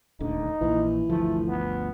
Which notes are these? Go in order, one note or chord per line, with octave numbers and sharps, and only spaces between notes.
D#1 D2 D3 D#4
A#1 A#2 E3
G1 D2 F3 A3
B3